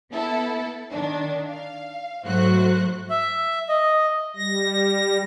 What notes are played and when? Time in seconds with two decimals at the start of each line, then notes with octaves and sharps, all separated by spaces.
0.13 B3 E4 A4
0.91 D#3 D4
1.48 F5
2.26 G#2 F#3 A3 F#4 C5 F#6
3.10 E5
3.69 D#5
4.36 G3 A#6